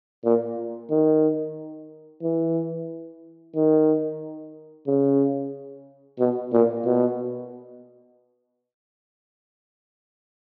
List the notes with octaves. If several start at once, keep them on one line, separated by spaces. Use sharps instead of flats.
A#2
D#3
E3
D#3
C#3
B2
A#2
B2